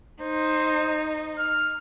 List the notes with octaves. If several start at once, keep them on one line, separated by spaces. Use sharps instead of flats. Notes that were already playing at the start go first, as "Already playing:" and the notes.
D#4 C5
F6